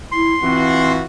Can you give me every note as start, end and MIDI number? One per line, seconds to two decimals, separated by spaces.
0.12 0.35 64
0.12 0.92 84
0.43 1.06 52
0.43 1.01 60
0.43 1.06 65
0.43 1.06 66